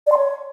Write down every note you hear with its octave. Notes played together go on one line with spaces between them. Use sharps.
D5
C6
C#5